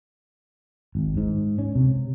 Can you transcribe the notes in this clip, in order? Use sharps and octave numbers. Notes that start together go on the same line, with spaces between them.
G#1
G#2
C#4
C3